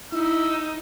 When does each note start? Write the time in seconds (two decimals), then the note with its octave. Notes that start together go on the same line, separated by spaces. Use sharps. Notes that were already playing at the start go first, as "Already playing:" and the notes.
0.12 D#4 E4 E6